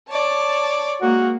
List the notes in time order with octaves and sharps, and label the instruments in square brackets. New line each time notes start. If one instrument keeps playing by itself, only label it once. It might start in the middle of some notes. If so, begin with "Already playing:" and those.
[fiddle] C#5 D5 [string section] A5
[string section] G#3 A#3 [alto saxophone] F#4